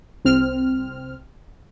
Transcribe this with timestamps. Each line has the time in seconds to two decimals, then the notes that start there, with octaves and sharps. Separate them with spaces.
0.25 C2 C4 F6